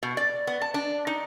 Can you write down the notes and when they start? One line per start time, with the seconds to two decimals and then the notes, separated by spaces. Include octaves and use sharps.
0.03 B2
0.17 D5
0.47 B3
0.61 A5
0.74 D4
1.07 D#4